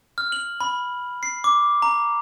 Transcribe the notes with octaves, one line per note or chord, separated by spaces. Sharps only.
F6
F#7
B5
C7
D6
A#5